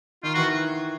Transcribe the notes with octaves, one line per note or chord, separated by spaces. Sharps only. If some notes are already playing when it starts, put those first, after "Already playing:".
D#3 F4
E3 F#4